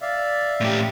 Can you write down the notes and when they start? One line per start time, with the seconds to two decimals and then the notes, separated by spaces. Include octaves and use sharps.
0.01 D5 E5 F5
0.60 A2 G4